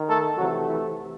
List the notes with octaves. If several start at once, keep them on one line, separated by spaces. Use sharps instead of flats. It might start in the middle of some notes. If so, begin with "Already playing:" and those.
Already playing: D#3
A3 A4
C3 E3 F#3 A3 F#4
E3 E4